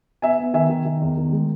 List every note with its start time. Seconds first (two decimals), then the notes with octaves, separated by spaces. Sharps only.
0.22 B3 E5 G#5
0.39 B3
0.54 D#3 E5 G#5
0.69 D#3
0.85 D#3
1.01 E2
1.17 D#3
1.32 G#3